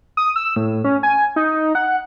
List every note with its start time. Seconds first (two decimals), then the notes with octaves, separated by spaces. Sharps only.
0.17 D#6
0.36 E6
0.56 A2
0.84 C#4
1.03 G#5
1.36 D#4
1.75 F#5